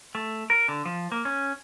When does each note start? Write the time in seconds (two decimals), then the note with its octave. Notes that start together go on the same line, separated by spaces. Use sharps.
0.15 A3
0.50 A#4
0.68 D3
0.86 F3
1.12 A#3
1.25 C#4